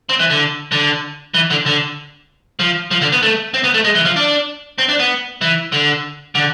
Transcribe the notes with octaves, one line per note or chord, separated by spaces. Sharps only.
C4
E3
D3
D3
E3
D3
D3
F3
F3
D3
B3
A3
C4
B3
A3
G#3
E3
F3
D4
C4
D4
B3
E3
D3
D3